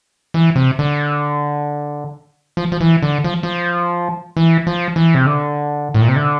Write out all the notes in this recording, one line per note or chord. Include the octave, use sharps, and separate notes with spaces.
E3
C3
D3
F3
F3
E3
D3
F3
F3
E3
F3
E3
C3
D3
A2
A#2
C3
D3